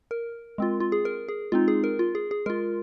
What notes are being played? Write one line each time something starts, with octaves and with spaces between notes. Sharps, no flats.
A#4
G#3 C4 F4
F4
G#4
A#4
G#4
G#3 C4 D#4 F4
G#4
A#4
F4
G#4
G#4
G#3 F4 A#4